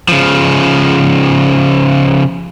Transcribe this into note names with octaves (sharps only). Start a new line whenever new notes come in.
C#3 F3